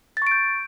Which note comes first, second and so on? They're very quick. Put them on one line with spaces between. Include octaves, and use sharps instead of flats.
A6 C#6 D7 G6